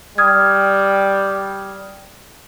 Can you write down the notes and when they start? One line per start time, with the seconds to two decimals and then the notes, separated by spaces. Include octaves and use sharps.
0.18 G3 D#6 F6 G#6